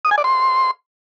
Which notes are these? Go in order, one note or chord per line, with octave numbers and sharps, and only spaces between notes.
D#6
G#5
D5
C6